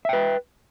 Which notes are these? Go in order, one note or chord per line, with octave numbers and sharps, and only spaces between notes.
B4 E5 G5